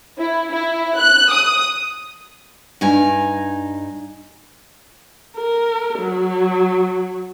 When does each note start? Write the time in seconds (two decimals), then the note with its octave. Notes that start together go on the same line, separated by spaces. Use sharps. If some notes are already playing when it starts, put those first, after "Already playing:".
0.19 E4
0.51 E4
0.99 F#6
1.32 D#6
2.81 G2 D#4 G#5 A#5
5.37 A#4
5.98 F#3